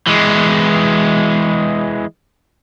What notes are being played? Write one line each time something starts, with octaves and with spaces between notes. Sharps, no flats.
E3 G#3